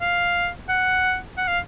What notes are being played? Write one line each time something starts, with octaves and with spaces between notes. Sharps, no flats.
F5
F#5
F#5
F5